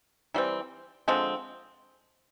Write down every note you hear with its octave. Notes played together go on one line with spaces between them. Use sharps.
E3 G3 C4
D3 F3 G#3 C4